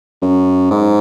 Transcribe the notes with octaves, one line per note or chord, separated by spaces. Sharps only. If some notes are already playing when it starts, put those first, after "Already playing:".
F#2
G#2